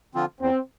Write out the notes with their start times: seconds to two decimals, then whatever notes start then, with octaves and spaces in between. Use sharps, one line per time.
0.14 D3 F3 C4 F4
0.40 E2 C4